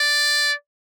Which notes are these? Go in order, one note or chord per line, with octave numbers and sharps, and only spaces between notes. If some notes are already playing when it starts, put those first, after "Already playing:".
Already playing: D5